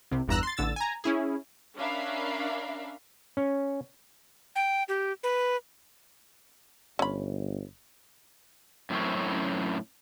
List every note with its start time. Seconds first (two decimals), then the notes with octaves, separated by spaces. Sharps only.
0.11 C2 C3
0.28 G1 E2 G2 A#5 E6 F#6
0.43 C6 A6
0.57 A1 D3 E6 A6
0.76 G#5 A#5
1.04 C#4 E4 G#4
1.76 C#4 D4 A#4 E5 F5 B5
3.37 C#4
4.56 G5
4.88 G4
5.23 B4
6.99 G1 C#4 B5
8.90 F#2 A2 C4 C#4